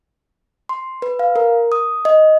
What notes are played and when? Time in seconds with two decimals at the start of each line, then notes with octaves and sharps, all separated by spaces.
0.69 C6
1.02 B4
1.19 F5
1.36 A#4
1.72 D#6
2.05 D#5